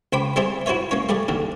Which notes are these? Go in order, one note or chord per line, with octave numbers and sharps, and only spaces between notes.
C#2 C5 G5 B5 D6
G3 C4 G4 G#4 C5 E5
E4 F#4 C5 C#5 E5
A#3 C#4 C#5
G3 A3 G#4 D5
D#2 D3 D#3